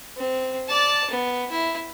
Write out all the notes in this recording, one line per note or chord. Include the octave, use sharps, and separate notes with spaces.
C4
D5 A5
B3
E4